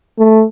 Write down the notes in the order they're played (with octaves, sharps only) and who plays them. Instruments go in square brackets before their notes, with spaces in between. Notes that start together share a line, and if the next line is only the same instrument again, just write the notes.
[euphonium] A3